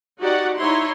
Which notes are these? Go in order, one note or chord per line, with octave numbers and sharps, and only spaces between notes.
D#4 F#4 G4 D5 F#5
D#4 E4 C#5 C6